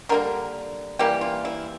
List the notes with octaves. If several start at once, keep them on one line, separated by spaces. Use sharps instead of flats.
D3 G3 A#3 A#4
E3 G3 A#3 G4
F4
E4